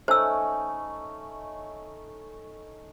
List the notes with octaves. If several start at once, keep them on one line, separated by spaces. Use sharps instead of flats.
A3 C#4 D#4 C5 E6